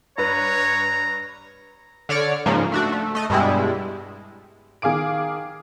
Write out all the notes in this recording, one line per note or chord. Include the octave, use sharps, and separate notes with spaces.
G2 B4 C#5 A#5
D3 C#5 D5 F6
G#2 C#3 F3 A#3
A3 D4 F#4
A3
A3 D#5
G2 B2 G3 G#3 E4
D#3 G#4 F5 D6 D7